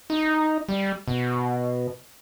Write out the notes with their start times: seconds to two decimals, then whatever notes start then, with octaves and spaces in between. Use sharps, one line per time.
0.10 D#4
0.69 G3
1.08 B2